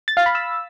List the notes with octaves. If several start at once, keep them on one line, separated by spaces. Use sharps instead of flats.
A6
F5
B5
E6